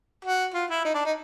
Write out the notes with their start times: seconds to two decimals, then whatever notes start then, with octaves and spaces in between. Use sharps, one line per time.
0.25 F#4
0.54 F4
0.70 E4
0.85 D#4
0.94 D4
1.05 D#4